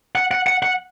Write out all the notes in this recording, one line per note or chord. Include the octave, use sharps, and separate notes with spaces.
F#5
F#5
F#5
F#5